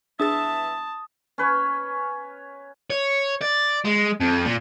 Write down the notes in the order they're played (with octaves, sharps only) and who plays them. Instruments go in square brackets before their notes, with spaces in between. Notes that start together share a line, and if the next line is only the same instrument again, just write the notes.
[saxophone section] E3 B3 E5 [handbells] D4 G#4 A6 [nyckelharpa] A5 [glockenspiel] D#6
[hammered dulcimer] C#4 B4 C#5
[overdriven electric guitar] C#5
D5
G#3
F2
A#2